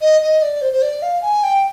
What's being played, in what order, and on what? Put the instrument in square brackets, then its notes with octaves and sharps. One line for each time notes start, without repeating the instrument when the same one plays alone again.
[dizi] D#5
D#5
D5
C5
C5
D5
F5
G#5
G5